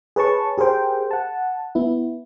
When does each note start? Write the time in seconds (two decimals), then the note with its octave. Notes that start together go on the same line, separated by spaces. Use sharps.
0.16 G#4 B4 C#5 A5 C#6
0.58 G4 G#4 A#4 C5 G5
1.11 F#5 A5
1.75 B3 E4